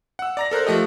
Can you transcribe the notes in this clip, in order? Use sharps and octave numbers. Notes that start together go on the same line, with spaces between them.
F#5 E6
D5 A#5 A#6
A4 A#4 C5 F#6
F3 A3 G4 D#5